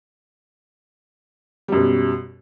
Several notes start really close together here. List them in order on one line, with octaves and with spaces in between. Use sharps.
G3 F#2 B2